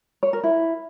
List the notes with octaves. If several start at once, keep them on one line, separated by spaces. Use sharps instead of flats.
C#5
A#4
E4